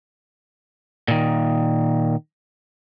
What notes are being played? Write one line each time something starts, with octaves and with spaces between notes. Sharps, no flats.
A#2 D#3